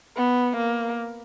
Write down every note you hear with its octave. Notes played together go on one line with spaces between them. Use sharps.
B3
A#3